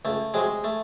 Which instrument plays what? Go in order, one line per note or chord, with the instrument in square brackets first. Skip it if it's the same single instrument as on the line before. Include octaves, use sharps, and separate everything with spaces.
[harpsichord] C#2 A3
C3 F#3 G#3
A3